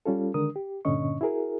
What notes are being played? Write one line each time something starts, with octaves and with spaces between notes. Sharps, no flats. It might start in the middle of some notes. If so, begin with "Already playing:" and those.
G3 C#4 F4 A4
D3 D#3 G#3 D4 A#4 D#6
G4
G2 A#2 D3 C#4 D#5 C#6
E4 F#4 G#4 A#4